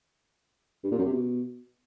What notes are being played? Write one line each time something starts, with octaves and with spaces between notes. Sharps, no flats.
G2
A#2
F#2
C3
B2